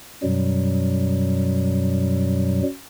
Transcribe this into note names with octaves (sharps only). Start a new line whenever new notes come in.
F#2 B2 F#3 G3